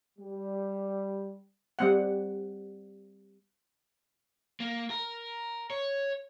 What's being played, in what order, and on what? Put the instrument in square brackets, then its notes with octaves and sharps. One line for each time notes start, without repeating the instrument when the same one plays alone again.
[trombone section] G3
[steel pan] G3 C4 F#5
[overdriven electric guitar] A#3
A#4
C#5